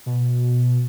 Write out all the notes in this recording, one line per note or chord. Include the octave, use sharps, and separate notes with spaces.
B2